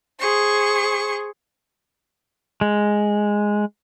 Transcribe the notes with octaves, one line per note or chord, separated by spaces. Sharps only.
G#4 C5 C#6
G#3